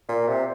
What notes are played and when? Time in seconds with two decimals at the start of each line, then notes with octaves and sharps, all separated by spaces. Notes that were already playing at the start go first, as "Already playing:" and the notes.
0.09 A#2
0.28 C3